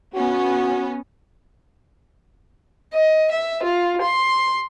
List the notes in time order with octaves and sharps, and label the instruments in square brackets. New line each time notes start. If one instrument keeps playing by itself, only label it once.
[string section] B3 C#4 [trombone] F#4
[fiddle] D#5
E5
F4
C6